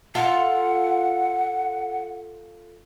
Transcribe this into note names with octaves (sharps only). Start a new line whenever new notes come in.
F4 A4 F5 F#5